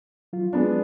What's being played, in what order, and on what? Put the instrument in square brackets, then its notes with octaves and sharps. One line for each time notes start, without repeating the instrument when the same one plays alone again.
[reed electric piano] F#3 F4
[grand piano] G#3 B3 D4